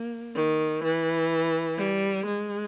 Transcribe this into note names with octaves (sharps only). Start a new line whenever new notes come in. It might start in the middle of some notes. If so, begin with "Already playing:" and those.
Already playing: A#3
D#3
E3
G3
G#3